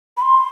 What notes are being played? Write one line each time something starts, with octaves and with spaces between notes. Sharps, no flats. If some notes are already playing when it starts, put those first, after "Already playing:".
B5
C6